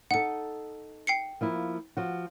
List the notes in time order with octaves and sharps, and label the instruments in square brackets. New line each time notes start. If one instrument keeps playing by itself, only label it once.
[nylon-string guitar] D#4 A4 [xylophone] F#5 C#7
[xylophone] G5 C7 C#7
[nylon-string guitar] F3 A#3 E4
F3 F#4